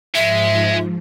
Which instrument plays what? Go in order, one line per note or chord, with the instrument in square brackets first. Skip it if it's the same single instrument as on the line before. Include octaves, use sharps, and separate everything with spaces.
[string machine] G#2 F3 [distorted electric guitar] G#3 [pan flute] E5